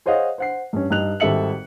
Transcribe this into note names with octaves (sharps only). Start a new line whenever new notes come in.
G#4 C5 C#5 D#5 F5 F#5
C5 F#5 C7
G2 C#4
G2 D#4 F#6 F7
G#1 G3 A4 E5 C#7 F#7